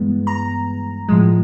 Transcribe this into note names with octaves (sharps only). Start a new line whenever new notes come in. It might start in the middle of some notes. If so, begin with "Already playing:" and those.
Already playing: G2 E3 G#3 B3
A#5
A2 F3 G#3